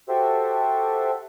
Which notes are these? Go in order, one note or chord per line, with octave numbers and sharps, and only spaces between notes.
F#4 G4 A4 C5 E5